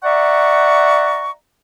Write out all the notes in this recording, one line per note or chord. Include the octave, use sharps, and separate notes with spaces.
D5 E5 F#5 A#5 C#6